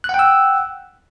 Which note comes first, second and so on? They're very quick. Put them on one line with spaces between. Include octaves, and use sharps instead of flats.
F#6 F#5 G5 E6